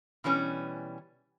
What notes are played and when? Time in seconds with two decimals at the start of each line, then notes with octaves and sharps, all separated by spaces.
0.24 B2 E3 G3 C#4